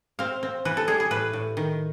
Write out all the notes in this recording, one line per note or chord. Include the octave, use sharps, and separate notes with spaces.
C4 F5
C4
E3 B4
A4
G3 G#4
G#4
A2 B4
A2
D#3